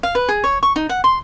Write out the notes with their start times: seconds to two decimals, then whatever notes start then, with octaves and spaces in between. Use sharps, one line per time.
0.03 F5
0.15 B4
0.29 G#4
0.44 C#5
0.63 C#6
0.76 D#4
0.89 F#5
1.04 C6